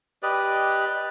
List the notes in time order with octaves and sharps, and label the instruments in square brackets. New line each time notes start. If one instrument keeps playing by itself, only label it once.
[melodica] G4 B4 D5 D#5